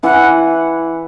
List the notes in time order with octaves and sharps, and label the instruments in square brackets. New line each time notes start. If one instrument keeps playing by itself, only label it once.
[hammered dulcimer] E3 E4 [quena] F#5